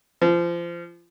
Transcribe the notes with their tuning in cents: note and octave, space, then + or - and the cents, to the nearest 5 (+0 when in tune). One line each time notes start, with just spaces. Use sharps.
F3 -30